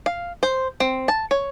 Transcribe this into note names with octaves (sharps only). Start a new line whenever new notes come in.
F5
C5
C4
A5
C#5